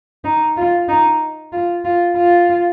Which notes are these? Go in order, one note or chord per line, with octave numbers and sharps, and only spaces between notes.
D#4
F4
D#4
F4
F4
F4